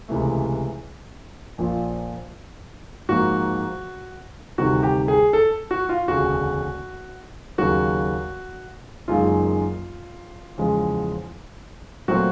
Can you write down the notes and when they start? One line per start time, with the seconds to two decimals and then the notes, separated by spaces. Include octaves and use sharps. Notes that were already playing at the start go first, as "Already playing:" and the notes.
0.08 C#2 C3 E3 A3
1.58 A#1 A#2 F3
3.09 G#2 F3 A#3 F#4
4.58 D2 C3 D#3 G3 C4 F#4
4.83 G4
5.08 G#4
5.33 A4
5.71 F#4
5.89 F4
6.08 E1 D2 C#3 F#4
7.58 D#2 C#3 F#3 F#4
9.08 F#1 F#2 D#3 G#3 F4
10.58 E2 C#3 F3 G#3
12.08 A#2 F#3 A3 C4 F#4